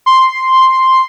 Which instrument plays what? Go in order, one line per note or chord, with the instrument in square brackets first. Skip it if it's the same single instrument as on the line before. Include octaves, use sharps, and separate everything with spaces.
[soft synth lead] C6